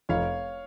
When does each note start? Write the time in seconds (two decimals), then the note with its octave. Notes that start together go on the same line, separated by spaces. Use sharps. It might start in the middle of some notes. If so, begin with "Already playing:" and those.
0.09 F1 C#5 F5